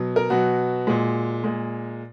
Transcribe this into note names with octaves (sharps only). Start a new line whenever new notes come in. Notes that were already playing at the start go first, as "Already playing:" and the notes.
Already playing: B2 F#3
A#4
B2 F#3 F#4
A#2 G#3
A#2 G#3